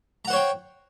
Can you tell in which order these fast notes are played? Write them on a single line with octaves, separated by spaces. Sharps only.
A#5 F#5 C5 C#5 G5